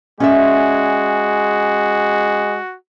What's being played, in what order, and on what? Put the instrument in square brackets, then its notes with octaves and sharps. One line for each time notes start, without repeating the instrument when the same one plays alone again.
[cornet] G#3 [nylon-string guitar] C#4 D5 E5 [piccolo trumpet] F#4